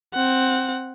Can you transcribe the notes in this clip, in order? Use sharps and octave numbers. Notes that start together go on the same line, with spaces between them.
C4 F#5